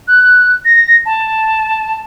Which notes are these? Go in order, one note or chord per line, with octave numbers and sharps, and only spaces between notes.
F#6
A#6
A5